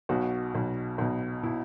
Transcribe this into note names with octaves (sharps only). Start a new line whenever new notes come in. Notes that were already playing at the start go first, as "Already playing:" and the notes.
B1 B2 F#4
B1 B2
B1 B2
B2 E4